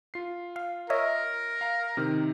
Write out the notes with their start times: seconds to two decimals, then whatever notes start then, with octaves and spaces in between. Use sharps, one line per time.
0.14 F4 C7
0.56 F5
0.90 A#4 C#5 D#5 E5
1.61 F5 A#5
1.97 C3 D#3 D#4